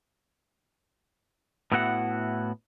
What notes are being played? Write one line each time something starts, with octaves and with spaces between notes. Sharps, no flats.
A2 B3 E4 F#4 A#4 F#5